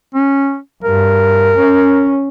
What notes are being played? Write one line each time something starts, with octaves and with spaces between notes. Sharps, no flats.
C#4
G2 A#4
C#4